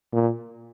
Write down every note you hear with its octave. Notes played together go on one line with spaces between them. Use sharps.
A#2